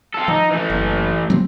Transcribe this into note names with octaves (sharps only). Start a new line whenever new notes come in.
F4 A4
F3 D#4
E3 A3
F#1
F#3 A#3 C4